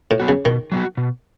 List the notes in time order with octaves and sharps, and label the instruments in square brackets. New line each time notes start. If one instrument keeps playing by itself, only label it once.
[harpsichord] A2
[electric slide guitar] F#3 B3 F#4
[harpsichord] C#3
[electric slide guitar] B2 [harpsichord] D#3
[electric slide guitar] F#3 B3 F#4
B2